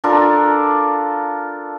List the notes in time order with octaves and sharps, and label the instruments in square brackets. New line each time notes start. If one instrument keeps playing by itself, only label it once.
[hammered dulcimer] D4 F4 A4 A#4